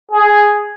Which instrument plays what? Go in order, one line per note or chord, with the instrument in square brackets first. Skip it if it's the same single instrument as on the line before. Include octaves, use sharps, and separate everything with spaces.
[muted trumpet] G#4